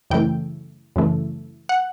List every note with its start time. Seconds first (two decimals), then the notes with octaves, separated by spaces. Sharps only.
0.10 F#2 C#3 E3 A3 G5
0.96 F#2 C#3 E3 A3
1.69 F#5